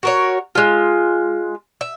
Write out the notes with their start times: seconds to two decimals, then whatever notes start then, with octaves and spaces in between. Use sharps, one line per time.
0.03 F#4 A#4 C#5
0.55 G#3 F4
1.81 E5